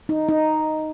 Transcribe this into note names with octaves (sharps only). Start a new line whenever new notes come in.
D#4
D#4